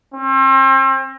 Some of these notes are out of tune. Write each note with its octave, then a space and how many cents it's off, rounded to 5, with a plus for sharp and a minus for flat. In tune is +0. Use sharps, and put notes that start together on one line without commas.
C4 +40